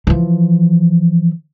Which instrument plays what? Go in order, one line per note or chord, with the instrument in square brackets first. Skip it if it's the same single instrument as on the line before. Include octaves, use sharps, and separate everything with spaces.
[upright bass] E3 F3